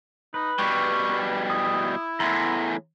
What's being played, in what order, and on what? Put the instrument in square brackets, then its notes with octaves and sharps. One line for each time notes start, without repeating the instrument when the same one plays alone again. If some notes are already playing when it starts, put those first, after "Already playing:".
[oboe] D#4 [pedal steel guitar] B4
[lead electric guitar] B2 G3 [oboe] C#6
[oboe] E4 [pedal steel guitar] D#6
[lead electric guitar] E2 A2 [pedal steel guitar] A#5 C6